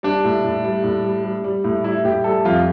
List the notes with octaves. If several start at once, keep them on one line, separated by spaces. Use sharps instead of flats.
G3 D4
A2
A2
G3
A2
G3
G3
G3
A2
G3 E4
A2 G4
G3 A4
F2 F4